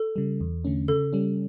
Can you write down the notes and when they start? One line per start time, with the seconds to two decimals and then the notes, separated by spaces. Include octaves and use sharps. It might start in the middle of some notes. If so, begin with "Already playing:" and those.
Already playing: A4
0.16 C#3 G3
0.41 E2
0.64 D3 A3 C#4
0.88 C#3 A4
1.13 G3 C#4